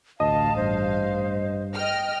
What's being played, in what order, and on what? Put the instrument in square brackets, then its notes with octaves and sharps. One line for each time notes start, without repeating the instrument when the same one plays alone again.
[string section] A1 F5 [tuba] D2 [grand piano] D#5 [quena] A5
[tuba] G2 [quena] C5
[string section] D#5 G5 F6